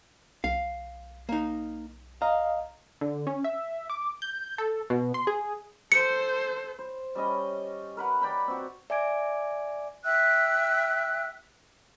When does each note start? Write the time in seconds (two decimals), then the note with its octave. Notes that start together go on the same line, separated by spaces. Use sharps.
0.44 B1 F5
1.29 A#3 D#4
2.22 D#5 F5 A#5
3.01 D3
3.27 C#4
3.44 E5
3.90 D6
4.22 G6
4.58 A4
4.90 B2
5.14 C6
5.27 G#4
5.92 A4 C5 C#7
6.79 C5
7.15 G3 C#4 D#5
7.97 A#4 B4 F#5
8.21 D5 G5 B5
8.48 C4 F#4
8.90 D5 E5 G#5 D6 G#6 D7
10.05 E5 G5 E6 F#6